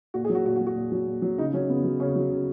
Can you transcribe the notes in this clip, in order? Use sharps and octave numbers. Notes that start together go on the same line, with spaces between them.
A#2 F#4
G#4
F#3
F#4
A#2 F#4
F#4
F#3
F#4
A#2
F#3
A#2
F#3
C#3 D#4
F#3 C#4
C#3 B3
F#3
C#3 C#4
F#3
C#3